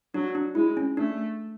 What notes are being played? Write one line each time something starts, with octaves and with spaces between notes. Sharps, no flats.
F#3 D4
D4
G#3 E4
C#4
A3 D4